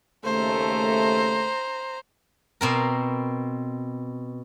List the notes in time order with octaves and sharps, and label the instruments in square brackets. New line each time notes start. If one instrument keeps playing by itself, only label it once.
[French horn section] D#2 C#3 A3 [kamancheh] C5 A#5
[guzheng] B2 C4 A#4